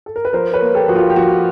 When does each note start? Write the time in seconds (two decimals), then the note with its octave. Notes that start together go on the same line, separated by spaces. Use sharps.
0.06 A4
0.16 A#4
0.25 B4
0.33 F3 A#4 C5
0.54 B4 C#5
0.61 A#3
0.75 G4 A4
0.88 F3 F#4
0.96 F4 G4
1.10 G4
1.16 F3 F#4